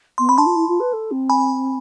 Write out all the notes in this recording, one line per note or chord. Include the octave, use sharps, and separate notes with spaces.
B3 C6
C4 B5
D4 A5 C6
F4
E4
F4
B4
A4
C4
G#5 B5